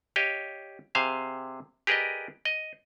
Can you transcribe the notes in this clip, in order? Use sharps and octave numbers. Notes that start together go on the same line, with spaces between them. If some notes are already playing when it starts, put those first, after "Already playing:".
G4 C#5 D#5 F5
C3 G#4 C5 F5 G#5
G4 G#4 A#4 B4 D5 D#5
D#5